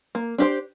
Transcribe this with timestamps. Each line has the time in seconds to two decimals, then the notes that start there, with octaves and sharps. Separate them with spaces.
0.15 A#3
0.38 D4 G4 C5